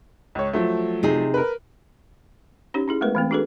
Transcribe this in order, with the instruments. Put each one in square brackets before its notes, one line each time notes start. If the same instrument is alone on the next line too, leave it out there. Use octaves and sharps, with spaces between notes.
[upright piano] C#2 C#5
F3 F#3 A3
[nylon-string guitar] C3 D#4 G#4
[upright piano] A#4 B4
[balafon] C#4 D#4 G4 C#5
C#4 E4 G#4
G#3 A3 B3 A#4 B4
E3 A3 C4
D4 F#4 G#4 A4 B4